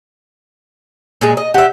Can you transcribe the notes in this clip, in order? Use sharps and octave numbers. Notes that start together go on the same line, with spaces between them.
A#2 G#3 G#4
D#5
G4 E5 F#5